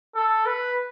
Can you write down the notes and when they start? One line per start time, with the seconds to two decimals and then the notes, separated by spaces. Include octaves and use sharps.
0.15 A4
0.46 B4